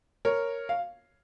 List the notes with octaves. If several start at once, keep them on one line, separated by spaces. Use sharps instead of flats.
A#4 C#5
F5